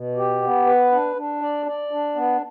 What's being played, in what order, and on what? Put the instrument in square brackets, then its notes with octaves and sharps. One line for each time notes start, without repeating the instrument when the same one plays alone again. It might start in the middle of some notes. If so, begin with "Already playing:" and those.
Already playing: [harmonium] B2
G4
B3
B4
D4
D4
D5
D5
D4
B3